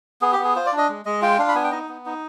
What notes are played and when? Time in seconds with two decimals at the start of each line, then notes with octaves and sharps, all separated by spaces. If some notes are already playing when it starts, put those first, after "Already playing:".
0.22 B3 G#4
0.33 G4
0.39 B3 G#4
0.56 F4 C5
0.66 D5
0.73 D4
0.78 D#5
0.89 G#3
1.05 G#3 D#5
1.22 F4 G5
1.39 D4 F5
1.48 B5
1.55 B3 G#5
1.64 G5
1.72 D#4 D#5
1.89 B3
2.06 D#4